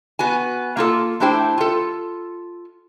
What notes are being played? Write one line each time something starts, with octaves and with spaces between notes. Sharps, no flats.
B3 F#4 G#5
A#3 F4 A4
A3 D4 E4 G4 C5 G5
F4 A4